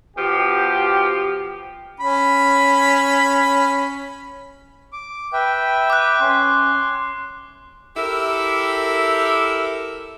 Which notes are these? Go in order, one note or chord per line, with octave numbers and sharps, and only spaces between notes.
B2 F3 G4
C#4 B5
D6
B4 E5 G5
D6 F#6
C#4 C6
E4 G4 A4 A#4 E5